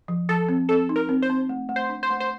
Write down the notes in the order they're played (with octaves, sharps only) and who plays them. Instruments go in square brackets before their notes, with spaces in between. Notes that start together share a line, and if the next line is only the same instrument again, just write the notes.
[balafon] F3
[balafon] F3 [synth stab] A4
[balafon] C4
[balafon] C4 [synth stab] A4
[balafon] D#4
[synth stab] A#4
[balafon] C4
[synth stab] C5
[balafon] C4
A3
A3
[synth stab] C5
[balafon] D4
[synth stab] C5
[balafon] A3
[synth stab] C5